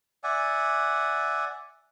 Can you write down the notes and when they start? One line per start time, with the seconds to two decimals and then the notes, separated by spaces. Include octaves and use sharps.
0.24 D5 E5 F#5 G#5